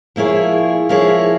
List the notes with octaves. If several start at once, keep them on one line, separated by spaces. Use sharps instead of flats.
F3 A#3 E4 G#4 C#5
F3 A#3 E4 G#4 C#5